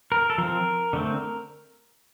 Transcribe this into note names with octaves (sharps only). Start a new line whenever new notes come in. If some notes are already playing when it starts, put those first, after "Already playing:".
A#4
A4
F3 C4 A#4
D3 A3 C4